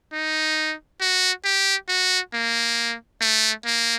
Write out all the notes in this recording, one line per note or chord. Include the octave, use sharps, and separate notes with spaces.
D#4
F#4
G4
F#4
A#3
A3
A#3